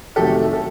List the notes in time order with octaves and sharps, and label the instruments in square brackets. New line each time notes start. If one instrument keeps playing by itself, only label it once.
[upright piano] F2 C3 D#3 F#3 A3 G4 A4
A4